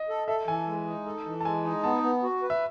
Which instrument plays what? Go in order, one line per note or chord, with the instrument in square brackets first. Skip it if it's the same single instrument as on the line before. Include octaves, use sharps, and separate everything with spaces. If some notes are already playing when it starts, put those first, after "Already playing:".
Already playing: [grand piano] D#5
[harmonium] A4
[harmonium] A4 [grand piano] E5
[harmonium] E3 [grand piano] G#5
[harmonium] G#3
D#4
A4
E3
[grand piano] A5
[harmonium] G#3 [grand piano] G#5
[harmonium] D#4
[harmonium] B3 [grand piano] A5
[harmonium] B3
F#4
B4
[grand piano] E5